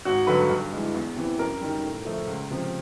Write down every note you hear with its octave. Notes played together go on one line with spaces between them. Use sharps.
G#1 F#4
G2 D3 F#3 B4
G2
E3 G#3
E2
C3 E3
F#2 A#4
D#3 G3
A2
F3 A3
C#2
C3 F3